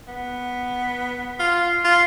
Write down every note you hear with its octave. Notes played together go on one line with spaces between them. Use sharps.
B3
F4
F4